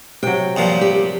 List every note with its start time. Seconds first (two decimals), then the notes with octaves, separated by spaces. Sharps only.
0.23 C3 F#3 G5
0.56 G2 A#2 F3
0.81 G4